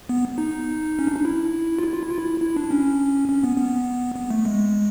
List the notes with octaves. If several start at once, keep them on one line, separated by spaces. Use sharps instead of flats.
B3
D#4
C#4
D4
D#4
E4
F4
E4
F4
E4
F4
E4
E4
D4
C#4
C#4
B3
B3
B3
A3
G#3